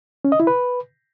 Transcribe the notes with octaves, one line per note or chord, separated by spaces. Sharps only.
C#4
D#5
E4
B4